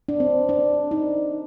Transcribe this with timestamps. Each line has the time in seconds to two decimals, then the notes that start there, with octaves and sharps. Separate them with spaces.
0.09 D4
0.20 C4
0.49 D4
0.91 D#4